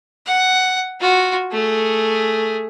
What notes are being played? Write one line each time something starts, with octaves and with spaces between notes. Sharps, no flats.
F#5
F4 F#4
A3 G#4